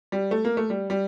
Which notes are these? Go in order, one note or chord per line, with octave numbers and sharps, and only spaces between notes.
G3
A3
A#3
A3
G3
G3